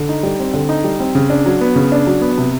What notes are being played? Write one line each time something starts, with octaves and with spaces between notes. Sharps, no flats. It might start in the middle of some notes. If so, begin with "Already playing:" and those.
Already playing: D3
D#4
G3
C4
D3
D#4
G3
C4
C#3
D4
F#3
B3
C#3
D4
F#3
B3
C3